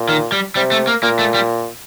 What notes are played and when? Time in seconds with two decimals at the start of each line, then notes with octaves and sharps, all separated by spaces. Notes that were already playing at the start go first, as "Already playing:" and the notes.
Already playing: A#2
0.09 D#3
0.32 G3
0.55 C3 G3
0.71 A3
0.87 A#3
1.02 A#2 A#3
1.19 A3
1.34 G3